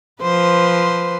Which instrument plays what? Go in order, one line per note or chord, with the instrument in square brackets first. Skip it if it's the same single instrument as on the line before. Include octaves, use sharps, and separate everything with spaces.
[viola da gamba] F3 B4 C5